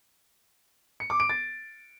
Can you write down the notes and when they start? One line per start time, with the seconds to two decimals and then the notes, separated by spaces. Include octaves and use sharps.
1.00 C#7
1.10 D6
1.20 D7
1.30 A6